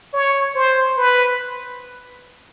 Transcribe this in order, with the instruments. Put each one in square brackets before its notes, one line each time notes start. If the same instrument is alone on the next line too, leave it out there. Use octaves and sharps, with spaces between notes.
[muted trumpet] C#5
C5
B4